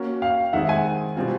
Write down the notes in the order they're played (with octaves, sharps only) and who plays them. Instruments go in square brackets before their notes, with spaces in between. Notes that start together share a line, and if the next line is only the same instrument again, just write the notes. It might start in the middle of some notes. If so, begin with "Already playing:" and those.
Already playing: [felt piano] A#3 C#4 F#4
[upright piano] F5 G5
[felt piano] D#3 G#3 C4 D#4 G#4 [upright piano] E5 F#5
[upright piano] F#5 G#5
[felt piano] B2 G3 C4 F4